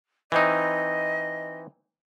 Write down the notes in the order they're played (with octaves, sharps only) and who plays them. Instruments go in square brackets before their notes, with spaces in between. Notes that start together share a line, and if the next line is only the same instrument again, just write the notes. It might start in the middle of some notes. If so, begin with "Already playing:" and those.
[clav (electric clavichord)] E3 C4 D#4 [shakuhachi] D#5